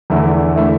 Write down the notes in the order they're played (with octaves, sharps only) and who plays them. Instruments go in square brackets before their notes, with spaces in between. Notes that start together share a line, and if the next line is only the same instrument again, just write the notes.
[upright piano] E2 D3 A3 E4
D3 A3 E4